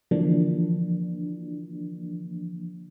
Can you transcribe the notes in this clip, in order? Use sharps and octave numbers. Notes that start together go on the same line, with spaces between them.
D3 E3 F3 A#3 D4